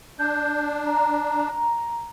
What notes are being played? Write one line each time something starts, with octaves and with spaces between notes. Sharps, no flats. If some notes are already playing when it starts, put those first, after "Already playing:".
D4 G6
A#5